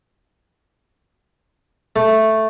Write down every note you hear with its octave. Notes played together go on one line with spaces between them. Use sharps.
A3